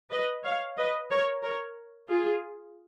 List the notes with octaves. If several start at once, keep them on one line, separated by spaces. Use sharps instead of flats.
B4 D#5
C#5 F5
B4 D#5
A#4 C#5
A#4 C#5
F4 G#4